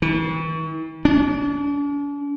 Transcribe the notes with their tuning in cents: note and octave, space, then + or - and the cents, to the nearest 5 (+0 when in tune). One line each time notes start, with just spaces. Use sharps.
E3 -45
D4 -45